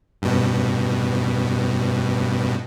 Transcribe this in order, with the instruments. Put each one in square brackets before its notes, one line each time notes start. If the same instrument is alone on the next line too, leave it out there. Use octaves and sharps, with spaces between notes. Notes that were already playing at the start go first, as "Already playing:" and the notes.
[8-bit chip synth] G2 B2